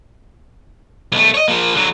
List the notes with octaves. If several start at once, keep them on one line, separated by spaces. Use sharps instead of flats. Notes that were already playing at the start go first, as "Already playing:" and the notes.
B1 A3
C#5 D#5
F3 A#3
D3 F#3